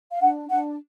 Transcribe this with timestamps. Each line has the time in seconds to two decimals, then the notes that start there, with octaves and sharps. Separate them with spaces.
0.12 F5
0.21 D4 F#5
0.49 D4 F#5